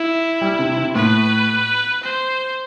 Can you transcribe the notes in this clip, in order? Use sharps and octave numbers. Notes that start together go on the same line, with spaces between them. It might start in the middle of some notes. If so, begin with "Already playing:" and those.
Already playing: E4
G3
C3
C3
A2 B4
C5